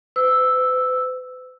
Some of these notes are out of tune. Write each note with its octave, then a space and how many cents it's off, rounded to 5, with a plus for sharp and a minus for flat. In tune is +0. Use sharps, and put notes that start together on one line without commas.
B4 +45 E6 +0